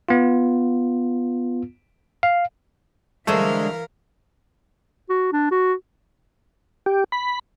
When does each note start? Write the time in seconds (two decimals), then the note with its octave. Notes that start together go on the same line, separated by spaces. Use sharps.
0.09 B3 F4
2.23 F5
3.27 D3 E3 G#3 A3 A#4 C5 F5
5.10 F#4
5.32 D4
5.51 F#4
6.86 G4
7.12 B5